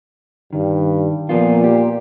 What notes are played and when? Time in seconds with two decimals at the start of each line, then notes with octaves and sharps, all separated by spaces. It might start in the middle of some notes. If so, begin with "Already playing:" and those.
0.53 G2 D#3
1.29 A#2 F3 B3 F4
1.64 G4